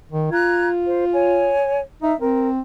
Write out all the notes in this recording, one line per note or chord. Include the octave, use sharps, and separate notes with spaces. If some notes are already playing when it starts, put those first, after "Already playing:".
D#3
F4 A#5 F#6 G#6
C5
C#5 G#5
D#4 E5
C4 A#4